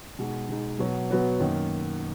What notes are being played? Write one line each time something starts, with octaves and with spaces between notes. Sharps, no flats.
B2 G#3 D#4
B2 G#3 D#4
B2 F#3 B3 F#4 C#5
B2 F#3 B3 F#4 C#5
F#2 D#3 A#3 D#4